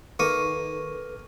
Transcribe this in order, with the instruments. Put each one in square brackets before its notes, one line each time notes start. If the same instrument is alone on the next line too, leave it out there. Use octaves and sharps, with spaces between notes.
[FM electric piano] D#3 [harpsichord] A#3 [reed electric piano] A4 B4 [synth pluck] C#6 D#7